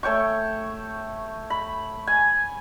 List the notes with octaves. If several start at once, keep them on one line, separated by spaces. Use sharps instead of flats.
A3 C#5 G5 C#6
B5
G#5